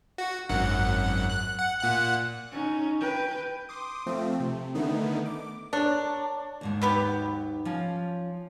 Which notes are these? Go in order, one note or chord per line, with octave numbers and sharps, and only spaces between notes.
F#4
G#1 F#2 F#5
F#6
F#5
A#2 F#5 F#6
C#4 D#4
B4 G5
C6 D6 D#6
F3 A3 C4
C3
D3 D#3 A3 B3 D#4
D6
D4 A#4 C#5
D#2 G#2 D#3
F#3 B3 G4
F3 C#4